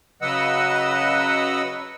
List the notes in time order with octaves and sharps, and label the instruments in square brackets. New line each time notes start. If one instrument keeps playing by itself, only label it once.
[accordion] C#3 F#3 B4 D#5 F#5 E6